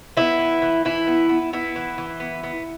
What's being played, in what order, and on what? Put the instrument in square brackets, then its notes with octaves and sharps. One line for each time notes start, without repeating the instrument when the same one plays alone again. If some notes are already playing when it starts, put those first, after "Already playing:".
[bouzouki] B3 E4
E3
E3
E3 E4
B3
B3
B3 E4
E3
E3
B3
B3